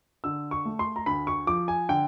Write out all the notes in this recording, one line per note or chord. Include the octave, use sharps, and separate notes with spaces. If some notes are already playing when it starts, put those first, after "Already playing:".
D3 E6
C#6
A3
C6
A#5
D2 B5
C#6
F3 D6
G#5
D3 G5